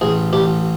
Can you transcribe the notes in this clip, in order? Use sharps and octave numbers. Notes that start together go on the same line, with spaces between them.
A1 G#4
A1 G4